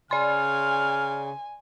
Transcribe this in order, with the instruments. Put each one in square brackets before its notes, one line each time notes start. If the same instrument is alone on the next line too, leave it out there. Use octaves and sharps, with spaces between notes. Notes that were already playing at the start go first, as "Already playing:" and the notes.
[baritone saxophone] C#3 [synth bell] D5 C6 [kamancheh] G#5 [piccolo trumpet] F6